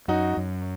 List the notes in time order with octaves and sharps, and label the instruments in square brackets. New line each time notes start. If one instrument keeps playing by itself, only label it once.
[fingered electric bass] F#2 [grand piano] D#4 F#4
[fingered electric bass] F#2